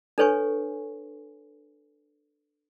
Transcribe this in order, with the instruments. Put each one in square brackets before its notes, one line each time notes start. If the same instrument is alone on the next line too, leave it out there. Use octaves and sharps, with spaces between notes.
[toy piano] D4 A4 B4 C#5 G#5 C#6